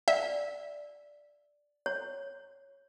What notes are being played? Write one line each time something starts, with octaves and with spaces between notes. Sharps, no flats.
D5 E5
C#5